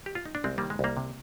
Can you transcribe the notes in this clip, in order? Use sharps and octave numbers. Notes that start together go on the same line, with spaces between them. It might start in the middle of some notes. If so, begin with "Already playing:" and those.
G4
F4
D#4
D4
C2 G#3 C4
D#3 G3 A#3
G#3
C2 G3 A#3
C3